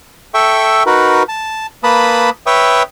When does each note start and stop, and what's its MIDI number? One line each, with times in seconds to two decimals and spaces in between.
0.34 0.83 69
0.34 0.83 76
0.34 0.83 79
0.34 0.83 85
0.86 1.23 63
0.86 1.23 66
0.86 1.23 70
0.86 1.23 71
1.29 1.66 81
1.84 2.30 58
1.84 2.30 71
1.84 2.30 81
1.84 2.30 83
1.84 2.30 87
2.46 2.83 71
2.46 2.83 73
2.46 2.83 76
2.46 2.83 79
2.46 2.83 85
2.46 2.83 87